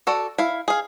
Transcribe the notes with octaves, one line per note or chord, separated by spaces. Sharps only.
F#4 A4 D5
E4 F5
G#4 F5